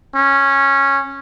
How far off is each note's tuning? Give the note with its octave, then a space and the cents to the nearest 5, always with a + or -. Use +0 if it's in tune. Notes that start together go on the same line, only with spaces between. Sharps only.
C#4 -10